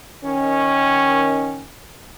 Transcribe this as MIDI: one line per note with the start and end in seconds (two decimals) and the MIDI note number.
0.25 1.65 51
0.25 1.65 61